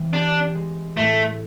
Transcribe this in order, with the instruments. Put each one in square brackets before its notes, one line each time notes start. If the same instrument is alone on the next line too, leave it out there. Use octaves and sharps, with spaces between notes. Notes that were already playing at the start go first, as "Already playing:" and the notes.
Already playing: [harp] E3 C4
[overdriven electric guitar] D4 [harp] G4
[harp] G#3
[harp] A2 [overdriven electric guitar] A3